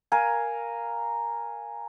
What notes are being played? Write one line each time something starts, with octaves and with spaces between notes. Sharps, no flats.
A#4 F5 G#5